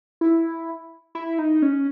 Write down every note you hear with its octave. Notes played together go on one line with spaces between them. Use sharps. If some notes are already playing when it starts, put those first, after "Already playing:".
E4
E4
D#4
C#4